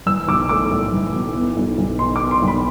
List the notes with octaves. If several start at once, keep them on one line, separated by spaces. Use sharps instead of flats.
E3 E6
B1 D6
A3 D6
A2
E3
B1
B3
B1
B1
B2 C6
D6
B3
C6
B1
B5